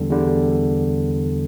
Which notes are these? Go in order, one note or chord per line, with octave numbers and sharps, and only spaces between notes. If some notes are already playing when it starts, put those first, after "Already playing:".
Already playing: E2 D3 G3
E2 D3 G3